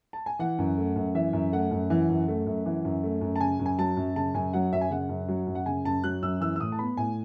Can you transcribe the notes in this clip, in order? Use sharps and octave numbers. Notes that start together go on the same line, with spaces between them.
A5
G#5
E3 F#5
F#2
A3
F#2
E3 E5
F#2
A3 F#5
F#2
E3
F#2
A3
F#2
E3
F#2
A3
F#2
A5
C#3 G#5
F#2
G#5
F#3 A5
F#2
C#3 A5
F#2 G#5
F#3 F#5
F#2 E5
G#5
C#3 F#5
F#2
F#3
F#2
F#5
C#3 G#5
F#2 A5
F#3 F#6
F#2 E6
E3 E6
E6
A2 D#6
A5
B3 B5
A2 G#5